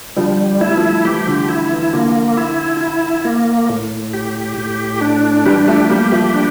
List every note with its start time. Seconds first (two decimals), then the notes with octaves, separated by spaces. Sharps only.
0.17 D3 F3 G3
0.61 A3 E4
0.69 G3
0.77 F3 A3
1.05 E3 G3 G4
1.27 D3 F3
1.49 E4
1.72 E3
1.93 D3 F3 A#3
2.37 E4
2.81 E4
3.25 A#3
3.70 A2
4.13 G4
4.58 A2
5.01 D4
5.46 E3 G3 G4
5.68 F3 A3
5.90 G3 A#3 G4
6.12 F3 A3
6.34 D4